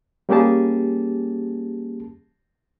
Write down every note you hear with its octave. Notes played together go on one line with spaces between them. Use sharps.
G3 A#3 C#4 G4 G#4 A5